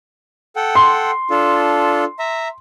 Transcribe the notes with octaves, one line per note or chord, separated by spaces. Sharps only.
A4 F#5 G5
C6
D4 F4 A4
E5 A#5